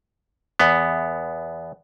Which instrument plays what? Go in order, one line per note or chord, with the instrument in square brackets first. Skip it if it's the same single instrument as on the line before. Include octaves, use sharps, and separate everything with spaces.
[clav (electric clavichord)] E2 B3